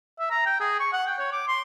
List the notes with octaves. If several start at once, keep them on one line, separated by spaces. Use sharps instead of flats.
E5
A#5
G5
G#4
C#6
F#5
G5
C#5
D6
C6